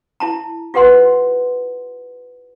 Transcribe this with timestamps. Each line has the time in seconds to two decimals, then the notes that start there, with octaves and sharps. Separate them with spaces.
0.20 E4 A5 A#5
0.74 F4 G4 B4 F#5 C6